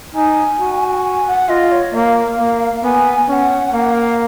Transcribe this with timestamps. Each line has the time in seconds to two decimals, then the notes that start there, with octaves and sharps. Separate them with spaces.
0.15 D#4 G#5
0.60 F#4
1.05 G#5
1.28 F#5
1.49 F4 D#5
1.72 C#5
1.94 A#3 F5
2.39 A#3
2.84 B3 G#5
3.29 C#4 F#5 G#5
3.74 A#3 F5
3.82 F#5
3.93 F5